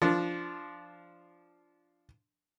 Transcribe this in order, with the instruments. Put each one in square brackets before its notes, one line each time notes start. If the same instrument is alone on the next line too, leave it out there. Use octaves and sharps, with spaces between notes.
[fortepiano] F3 D4